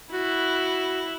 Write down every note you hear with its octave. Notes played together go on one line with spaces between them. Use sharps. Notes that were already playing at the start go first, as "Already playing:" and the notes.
E4 F#4